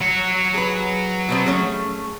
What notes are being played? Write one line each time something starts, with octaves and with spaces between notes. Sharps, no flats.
F#3 C#5
G#4 B4
B2 B3 C4
A3 C#4 G#4